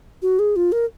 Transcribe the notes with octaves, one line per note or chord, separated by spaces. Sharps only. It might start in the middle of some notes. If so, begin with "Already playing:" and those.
F#4
G#4
F4
A#4